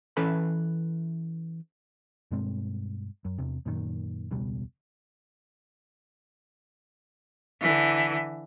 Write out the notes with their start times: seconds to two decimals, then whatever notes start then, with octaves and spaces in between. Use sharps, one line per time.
0.17 E3 C#4 A4 B4 B5
2.31 G2 B2 G#3 C4
3.25 F#2
3.38 E2 C3
3.66 F#2 A#2 D#3
4.31 E1 C#2 B2 G3
7.61 D3 E3